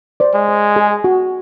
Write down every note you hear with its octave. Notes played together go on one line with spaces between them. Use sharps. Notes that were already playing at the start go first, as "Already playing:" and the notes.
C5 D5
G#3
C5
G#4
F#4